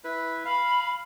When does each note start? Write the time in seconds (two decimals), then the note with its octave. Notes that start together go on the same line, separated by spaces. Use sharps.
0.04 E4 B4
0.45 F5 B5